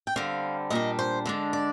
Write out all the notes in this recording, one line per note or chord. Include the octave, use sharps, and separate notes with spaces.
G5
D3 G3 C4 F5
A#2 G3 D4 D#5
C5
D3 G#3 D4
D5